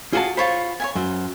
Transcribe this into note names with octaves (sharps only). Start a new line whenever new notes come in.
F4 F#4 G#4 A5
F4 C5 C#5 B5
C#5 E5 G#5
F#2 C5